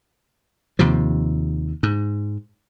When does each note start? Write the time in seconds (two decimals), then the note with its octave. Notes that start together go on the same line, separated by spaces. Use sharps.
0.79 D#2 C3 F3
1.83 G#2